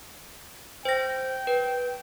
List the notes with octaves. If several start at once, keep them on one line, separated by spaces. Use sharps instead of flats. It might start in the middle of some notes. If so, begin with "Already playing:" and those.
C5 G5 A#6
B4